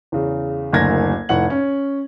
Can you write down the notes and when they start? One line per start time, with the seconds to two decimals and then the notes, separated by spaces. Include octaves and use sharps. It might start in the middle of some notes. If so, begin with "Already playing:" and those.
0.12 E2 C#3
0.73 F#1 D2 D4 A#4 G#6 A#6
1.29 F1 A2 F#5 F#7
1.50 C#4